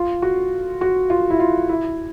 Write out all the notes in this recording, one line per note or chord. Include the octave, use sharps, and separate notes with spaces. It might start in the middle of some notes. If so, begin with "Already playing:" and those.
Already playing: F4
F#4
F#4
F4
E4
F4
E4